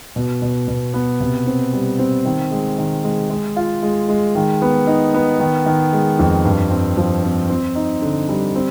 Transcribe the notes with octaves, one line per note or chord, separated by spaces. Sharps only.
B2
B2
B2
B3
C3
C4
G3
C4
D#3
G#3
D#3
G#3
G#3
F4
G#3
G#3
D#3
B3
D#4
B3
D#3
D#3
G#3
F2
G2
C4
F3
C4
C4
D#4
D3
G3
C4